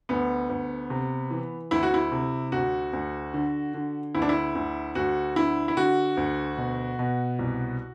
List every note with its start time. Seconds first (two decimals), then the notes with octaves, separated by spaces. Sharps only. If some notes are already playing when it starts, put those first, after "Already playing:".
0.09 D2 B3
0.50 D2
0.90 C3
1.31 E3
1.71 D2 E4
1.83 F#4
1.94 E4
2.12 C3
2.52 D2 F#4
2.93 D2
3.34 D3
3.74 D3
4.15 D2 E4
4.22 D4
4.29 E4
4.55 D2
4.95 D2 F#4
5.36 D3 E4
5.68 E4
5.77 D3 F#4
6.17 D2
6.58 B2
6.99 B2
7.39 C2